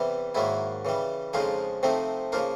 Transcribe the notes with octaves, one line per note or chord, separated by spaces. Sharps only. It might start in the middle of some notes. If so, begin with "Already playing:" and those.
Already playing: E2 C3 E3 G3
G#2 D#3 F#3 A#3 E4
C#3 E3 G3
F2 C#3 F3 G#3 D#4 F4
C3 F3 A3 C4 D#4
C#3 F3 A#3 D#4 F4